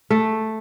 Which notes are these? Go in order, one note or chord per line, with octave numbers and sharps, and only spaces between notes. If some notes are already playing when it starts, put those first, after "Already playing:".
A3